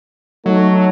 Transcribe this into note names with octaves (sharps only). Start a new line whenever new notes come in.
F#3 A3 D#4